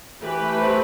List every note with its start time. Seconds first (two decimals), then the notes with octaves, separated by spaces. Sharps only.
0.22 E3 G4 B4
0.40 A3
0.57 C4